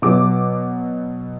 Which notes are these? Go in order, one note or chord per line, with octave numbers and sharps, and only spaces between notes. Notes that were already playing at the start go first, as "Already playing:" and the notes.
B2 F#3 D6